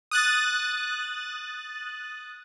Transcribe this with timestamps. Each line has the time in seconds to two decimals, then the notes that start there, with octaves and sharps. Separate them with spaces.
0.11 D#6 F#6 A6